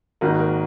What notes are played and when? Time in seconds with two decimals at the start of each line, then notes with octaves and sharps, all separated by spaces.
0.21 G#1 G#2 D#3 A#3 F#4
0.40 A#4